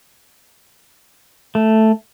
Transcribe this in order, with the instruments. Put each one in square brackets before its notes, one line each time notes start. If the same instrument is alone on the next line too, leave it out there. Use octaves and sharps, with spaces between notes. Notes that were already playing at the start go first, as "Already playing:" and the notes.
[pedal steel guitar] A3